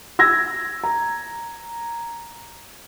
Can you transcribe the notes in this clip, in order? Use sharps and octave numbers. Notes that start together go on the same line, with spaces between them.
E6 G#6 A#6
A#5